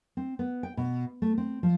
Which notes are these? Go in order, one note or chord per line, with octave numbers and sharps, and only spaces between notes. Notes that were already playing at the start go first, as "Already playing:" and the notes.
C4
B3
G5
B2
A3
C4
F3